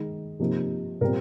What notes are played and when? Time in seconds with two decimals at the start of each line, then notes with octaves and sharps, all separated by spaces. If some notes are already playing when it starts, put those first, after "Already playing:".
Already playing: D#3 G#3 D#4
0.40 C3 F3 A#3 D#4
1.01 A#2 G3 C4 A#4